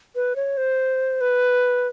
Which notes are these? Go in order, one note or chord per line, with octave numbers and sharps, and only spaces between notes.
B4
C#5
C5
B4